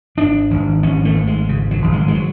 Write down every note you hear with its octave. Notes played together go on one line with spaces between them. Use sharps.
G#1 D4
G#1
G#1 C#4
A3
G#1
G#3
C#3
F#3
G#1
G#3
G#3
F#3